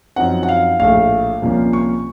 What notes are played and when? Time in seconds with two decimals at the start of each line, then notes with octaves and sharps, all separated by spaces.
0.16 F#2 F3 C4 D#4 F#5
0.43 F#5
0.49 F5
0.79 A#1 A2 A3 F5
1.42 C2 A#2 F3 A#3 C#4
1.73 C#6